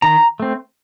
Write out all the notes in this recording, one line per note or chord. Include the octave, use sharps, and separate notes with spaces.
D#3 A#5
A3 C4